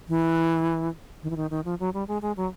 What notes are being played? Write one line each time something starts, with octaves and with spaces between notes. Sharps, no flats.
E3
D#3
E3
D#3
D#3
F3
F#3
G3
G#3
G#3
F#3